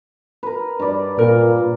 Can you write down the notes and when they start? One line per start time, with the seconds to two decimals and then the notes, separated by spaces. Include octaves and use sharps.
0.43 A#4 B4
0.80 G2 D5
1.19 A#2 A#4